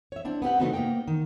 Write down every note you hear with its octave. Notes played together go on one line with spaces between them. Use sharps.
C#5 E5
C4 D4 E4
B3 C4 G4 F#5
C#3 A3 B3 D#4 F4 F#4
G#2 A#3 B3 D#4 G5
D#3